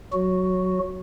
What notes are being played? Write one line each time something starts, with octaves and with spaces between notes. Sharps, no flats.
F#3 F#4